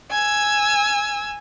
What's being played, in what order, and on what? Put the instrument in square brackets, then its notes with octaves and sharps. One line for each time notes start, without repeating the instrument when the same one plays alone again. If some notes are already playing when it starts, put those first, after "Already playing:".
[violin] G#5 E6